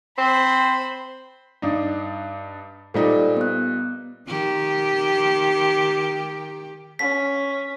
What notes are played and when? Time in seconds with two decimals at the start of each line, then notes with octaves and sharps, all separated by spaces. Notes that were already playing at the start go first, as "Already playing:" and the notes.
0.18 C4 C5 B5
1.62 G2 D4 D#4
2.94 A#2 G3 D#4 A4 C5 D5
3.37 B3 F#6
4.28 D#3 G4
6.99 C#4 B6